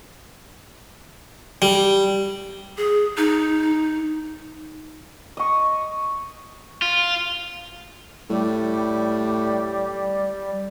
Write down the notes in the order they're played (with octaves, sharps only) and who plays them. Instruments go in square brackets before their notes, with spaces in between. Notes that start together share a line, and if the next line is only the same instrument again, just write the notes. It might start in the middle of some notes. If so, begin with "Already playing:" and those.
[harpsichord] G3
[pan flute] G#4
D#4
[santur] D#5 C#6
[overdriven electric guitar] F4
[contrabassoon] A2 [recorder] G3